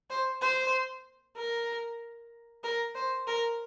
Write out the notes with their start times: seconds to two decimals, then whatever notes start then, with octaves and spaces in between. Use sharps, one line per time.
0.10 C5
0.41 C5
1.37 A#4
2.64 A#4
2.95 C5
3.27 A#4